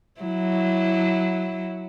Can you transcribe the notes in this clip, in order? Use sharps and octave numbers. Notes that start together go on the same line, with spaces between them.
F#3 E4